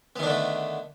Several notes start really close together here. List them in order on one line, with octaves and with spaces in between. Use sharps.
B3 D#3 D4 D3 A3